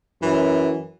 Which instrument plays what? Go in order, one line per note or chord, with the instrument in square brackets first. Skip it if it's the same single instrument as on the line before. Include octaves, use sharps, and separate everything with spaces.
[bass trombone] F#2 [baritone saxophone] E3